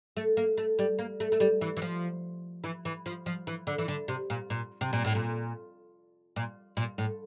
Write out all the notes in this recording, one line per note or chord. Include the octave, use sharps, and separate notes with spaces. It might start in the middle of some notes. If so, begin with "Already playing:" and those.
A3
A#3
A3
G3
A#3
A3
A3
G3
E3
E3
F3
E3
E3
F3
F3
E3
D3
E3
D3
C3
A#2
A#2
C3
A#2
A2
A#2
A#2
A#2
A2